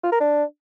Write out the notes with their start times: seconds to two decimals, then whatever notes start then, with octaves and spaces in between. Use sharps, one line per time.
0.04 F4
0.12 A#4
0.20 D4